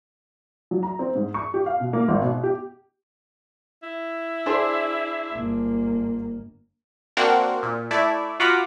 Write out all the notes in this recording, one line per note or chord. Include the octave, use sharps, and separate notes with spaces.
F#3
A#5
C4
G#2
C#6
G4
F5
B2
A#3
G#1
B2
G4
E4
D4 G#4 C5
G1 A#3
A#3 C4 D4 F#4 A#4 F#5
A#2
A3 E4 D5
F4 F#4 F#5 A#5 B5 D6